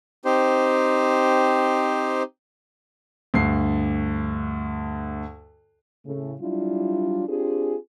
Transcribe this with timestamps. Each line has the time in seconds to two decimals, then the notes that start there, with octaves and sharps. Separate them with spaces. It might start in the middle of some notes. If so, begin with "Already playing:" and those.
0.25 C4 D#4 G4 C5
3.34 D2 G2 C7
6.06 A2 C#3 A3
6.40 F#3 G3 D4 E4 F4
7.28 C4 D4 F4 G4 G#4